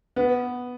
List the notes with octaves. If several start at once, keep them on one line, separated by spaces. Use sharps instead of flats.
B3